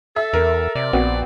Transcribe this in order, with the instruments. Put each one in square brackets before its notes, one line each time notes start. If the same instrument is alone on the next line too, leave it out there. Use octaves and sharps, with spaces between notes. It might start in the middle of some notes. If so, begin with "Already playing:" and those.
[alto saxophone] A4 [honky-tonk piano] E5
[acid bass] E2 [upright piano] A#4
[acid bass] C3 [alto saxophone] D5
[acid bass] A#1 [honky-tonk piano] B3 C4 F#4